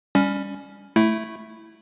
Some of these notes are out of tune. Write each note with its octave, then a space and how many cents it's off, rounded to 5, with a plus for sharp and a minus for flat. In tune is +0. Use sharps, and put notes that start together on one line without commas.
G3 +20 C#4 +15
A3 +0 E4 +0